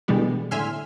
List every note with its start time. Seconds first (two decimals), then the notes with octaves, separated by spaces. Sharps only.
0.08 B2 D3 E3 G3 G#3 B3
0.51 A2 D3 E5 G#5 C6 F6